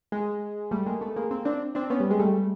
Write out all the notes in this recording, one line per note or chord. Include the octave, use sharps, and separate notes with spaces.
G#3
G3 A3
G#3 A#3
A3 B3
G#3 A#3
A#3 C4
C4 D4
C4 D4
B3 C#4
G3
G#3
G3 A3